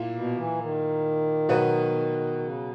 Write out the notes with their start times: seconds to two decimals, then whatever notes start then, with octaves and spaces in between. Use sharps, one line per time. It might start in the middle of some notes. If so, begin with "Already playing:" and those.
Already playing: A#2 A#3 E4
0.14 B2
0.35 E3
0.58 D#3
1.49 B2 F#3 B3 F#4 B4
2.39 C#3